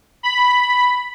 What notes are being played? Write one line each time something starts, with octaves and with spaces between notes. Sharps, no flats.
B5